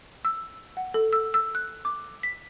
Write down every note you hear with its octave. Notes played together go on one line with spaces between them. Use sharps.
E6
F#5
A4
E6
E6
F#6
D6
B6